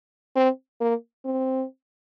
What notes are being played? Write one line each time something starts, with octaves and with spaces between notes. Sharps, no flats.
C4
A#3
C4